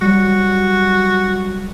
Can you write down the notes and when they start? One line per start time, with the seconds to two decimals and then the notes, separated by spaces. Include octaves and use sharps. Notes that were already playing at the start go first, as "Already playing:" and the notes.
0.02 F#3 G3 F#4